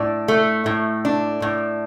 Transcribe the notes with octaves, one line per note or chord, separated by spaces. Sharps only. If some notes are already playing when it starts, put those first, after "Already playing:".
Already playing: A2 D4
A3
A2
D4
A2